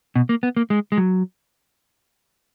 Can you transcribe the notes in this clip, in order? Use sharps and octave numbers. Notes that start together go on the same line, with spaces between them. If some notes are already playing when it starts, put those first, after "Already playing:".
B2
A#3
B3
A#3
G#3
G#3
F#3